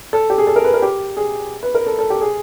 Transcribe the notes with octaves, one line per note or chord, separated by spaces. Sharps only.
A4
G4
G#4
A4
A#4
B4
A#4
G4
G#4
B4
A#4
A4
A4
G4
G#4